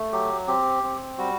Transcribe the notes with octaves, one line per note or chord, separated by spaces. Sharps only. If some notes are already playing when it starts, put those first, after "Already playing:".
Already playing: A3
F#3 G4
C4 G4
C4
G3 F#4